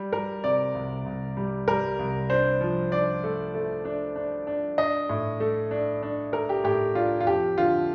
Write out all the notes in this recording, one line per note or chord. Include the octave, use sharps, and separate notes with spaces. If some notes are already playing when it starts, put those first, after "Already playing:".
Already playing: G3
G3 A#4
C3 D5
C2
C2
G3
G3 A#4
C2
D4 C5
F3
D4 D5
A3
A3
D4
D4
D4
D4 D#5
A2
A3
D4
D4
A3 A#4
G4
A2 G4
D4 F4
F4
F2 G4
D3 F4